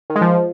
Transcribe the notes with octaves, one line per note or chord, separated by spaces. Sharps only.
D#3
G#3
F3